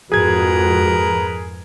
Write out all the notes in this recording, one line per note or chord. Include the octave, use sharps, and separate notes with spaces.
F2 G#2 F#4 G#4 A#4 B4 G#6